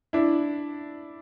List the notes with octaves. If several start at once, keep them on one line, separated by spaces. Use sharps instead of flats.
D4 E4